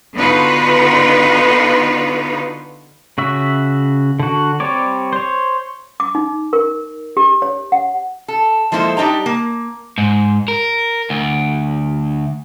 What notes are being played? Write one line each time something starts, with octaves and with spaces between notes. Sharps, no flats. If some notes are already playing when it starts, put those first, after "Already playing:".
D3 B3 D#4 F4 F#4 B4
C#3 F#4 E5
D3 F#4
G3 C4 C#5 D5
C5 C#5
D6
D#4
A#4
G4
C#5
F#5
A4
F3 G#3 A#3 E4 A4 C5
G3 D4 D#4 G5 A#5
A#3
G#2
A#4
D2